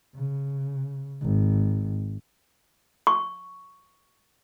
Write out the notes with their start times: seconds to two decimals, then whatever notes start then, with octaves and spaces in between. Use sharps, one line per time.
0.16 C#3
1.22 G#1
3.07 C#6